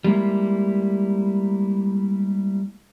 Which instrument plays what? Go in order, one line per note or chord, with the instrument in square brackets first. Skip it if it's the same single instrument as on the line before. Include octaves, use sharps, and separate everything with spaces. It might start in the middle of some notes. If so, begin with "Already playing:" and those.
[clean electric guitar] G3 G#3 A#3 E4